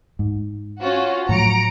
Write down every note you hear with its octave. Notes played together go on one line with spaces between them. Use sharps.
G#2
C#4 F4 F#4
A2 F3 F#3 A#5 C#7 D7